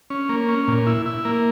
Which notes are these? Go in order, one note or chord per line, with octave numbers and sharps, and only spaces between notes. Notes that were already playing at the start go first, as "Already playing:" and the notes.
C#4
A#3
C#4
A#2
E4
E4
A#3